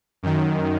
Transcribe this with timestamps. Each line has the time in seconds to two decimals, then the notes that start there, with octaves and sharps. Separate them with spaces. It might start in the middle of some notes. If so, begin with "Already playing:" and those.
0.23 F#2 D#3